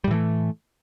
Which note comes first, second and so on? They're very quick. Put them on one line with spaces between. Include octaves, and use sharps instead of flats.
G3 A2 E3 A3